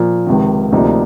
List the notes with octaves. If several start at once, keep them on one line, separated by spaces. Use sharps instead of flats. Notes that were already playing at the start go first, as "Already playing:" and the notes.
Already playing: A#2 F3 A#3
C#2 C3 D#3
D2 C3 F3 A#3 D#4